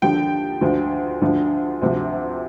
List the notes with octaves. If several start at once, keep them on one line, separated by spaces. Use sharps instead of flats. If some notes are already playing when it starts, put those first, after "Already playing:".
D#2 D3 F3 G5
D2 D3 F3
D2 D3 F3
D2 C3 F3